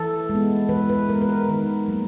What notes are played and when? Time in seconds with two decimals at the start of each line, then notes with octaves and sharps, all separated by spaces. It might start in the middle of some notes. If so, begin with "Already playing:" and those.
Already playing: E3 A4
0.29 G#3
0.35 B3
0.69 E3 B4
0.89 B4
1.09 G#3 B3 A#4
1.21 B4
1.29 A#4
1.49 D#3
1.88 F#3 A#3